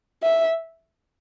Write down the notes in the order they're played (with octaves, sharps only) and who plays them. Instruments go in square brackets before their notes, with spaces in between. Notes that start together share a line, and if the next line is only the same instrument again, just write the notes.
[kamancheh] E5